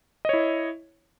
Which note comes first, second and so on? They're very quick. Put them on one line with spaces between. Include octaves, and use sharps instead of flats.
D#5 C#5 E4